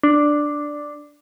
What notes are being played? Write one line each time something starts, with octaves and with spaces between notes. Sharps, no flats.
D4